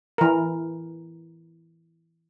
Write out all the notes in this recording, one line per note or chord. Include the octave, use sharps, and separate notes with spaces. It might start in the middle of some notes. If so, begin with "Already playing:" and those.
E3 A#4